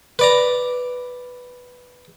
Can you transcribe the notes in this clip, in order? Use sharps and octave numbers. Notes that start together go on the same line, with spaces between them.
B4 D5 A#5